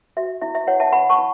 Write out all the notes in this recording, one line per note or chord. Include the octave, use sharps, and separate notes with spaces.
F#4 E5
E4 E5
E5
E4 C#5 F#5
E5 A5
C#5 F#5 B5
A5 C#6
E4